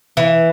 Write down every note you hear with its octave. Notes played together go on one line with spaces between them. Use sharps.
E3